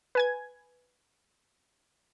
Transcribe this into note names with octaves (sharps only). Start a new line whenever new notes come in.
B4 G#5 G#6